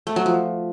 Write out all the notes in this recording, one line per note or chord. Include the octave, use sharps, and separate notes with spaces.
A3
F#3
F3